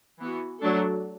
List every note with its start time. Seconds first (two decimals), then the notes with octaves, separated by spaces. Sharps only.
0.19 E3 B3 F#4
0.61 F#3 A3 D4 A4